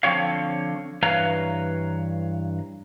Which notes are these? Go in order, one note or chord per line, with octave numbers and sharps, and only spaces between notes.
D3 F3 C4 F4 C#5 F5
G2 E3 B4 C#5 F5 A#5